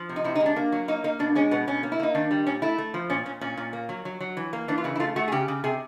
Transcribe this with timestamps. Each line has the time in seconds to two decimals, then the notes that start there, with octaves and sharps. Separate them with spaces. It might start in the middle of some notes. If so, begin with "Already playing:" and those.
Already playing: F3
0.09 C3
0.16 D#4
0.24 C3 E4
0.35 D#4
0.40 G#3
0.46 D4
0.56 A#3
0.72 F#3
0.88 A#3 D#4
1.04 A#3 D#4
1.19 B2 D4
1.35 G#3 C#4
1.51 B2 B3
1.67 B2 C#4
1.83 A#3
1.92 E4
2.00 A#3 D#4
2.15 D#3 D4
2.31 G3
2.46 A#2 C#4
2.62 A3 E4
2.78 A3
2.94 F3
3.10 A#2 C#4
3.26 A#2 C#4
3.41 A#2 C#4
3.57 A#2
3.73 A#3
3.89 F#3
4.05 F#3
4.20 F#3
4.37 E3
4.53 A#3
4.68 E3 D4
4.78 F4
4.84 C#3 E4
4.96 E4
5.00 A3 F4
5.16 A3 F#4
5.28 G#4
5.32 C#3 G4
5.48 C#3
5.64 C3 G#4